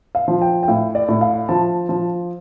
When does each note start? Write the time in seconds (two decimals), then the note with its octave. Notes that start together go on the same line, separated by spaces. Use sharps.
0.15 F5
0.28 F3
0.42 G5
0.63 G5
0.68 A2 F5
0.95 D5
1.08 A2
1.21 F5
1.49 F3 A5
1.89 F3